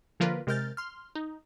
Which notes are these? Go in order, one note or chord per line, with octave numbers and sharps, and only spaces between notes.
D3 F3 A#3 F4 A#4 B4
C3 G#3 A#4 F6 G6 A6
C6 F6
D#4